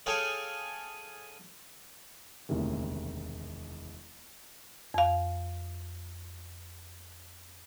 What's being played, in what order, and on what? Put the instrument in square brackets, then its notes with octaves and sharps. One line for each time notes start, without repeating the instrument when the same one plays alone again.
[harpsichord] G#4 A4 C#5 F5 G5 G#5
[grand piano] E1 A1 D2 C3 D#3
[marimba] F2 F5